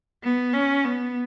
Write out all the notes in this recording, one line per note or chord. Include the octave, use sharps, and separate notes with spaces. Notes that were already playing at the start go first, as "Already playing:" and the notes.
B3
C#4
B3